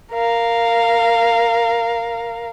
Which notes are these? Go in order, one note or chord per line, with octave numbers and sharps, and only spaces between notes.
A#4 F5